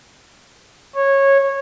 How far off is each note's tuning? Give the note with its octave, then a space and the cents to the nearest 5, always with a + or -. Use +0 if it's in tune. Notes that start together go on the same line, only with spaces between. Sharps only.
C#5 -15